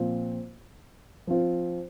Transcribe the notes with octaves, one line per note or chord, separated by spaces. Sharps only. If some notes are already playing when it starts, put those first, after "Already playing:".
Already playing: A#2 F3 C4 F4
F3 C4 F4